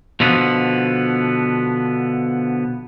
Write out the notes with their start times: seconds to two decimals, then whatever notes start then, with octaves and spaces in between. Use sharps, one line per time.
0.20 B2 D3 F3 B3